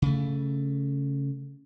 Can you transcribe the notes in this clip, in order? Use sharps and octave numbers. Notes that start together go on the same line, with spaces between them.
C#3 A3